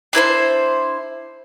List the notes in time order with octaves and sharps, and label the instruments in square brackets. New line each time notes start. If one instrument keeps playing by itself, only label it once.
[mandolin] D4 E4 B4 C5